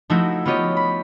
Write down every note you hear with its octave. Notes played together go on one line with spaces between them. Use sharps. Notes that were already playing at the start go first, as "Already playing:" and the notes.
F3 A3 D#4 E4 F#4
B3 F4 G4 C#5 D#5
B5